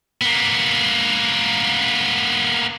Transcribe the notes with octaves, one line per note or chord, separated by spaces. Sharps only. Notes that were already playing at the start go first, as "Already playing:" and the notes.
A#3 B3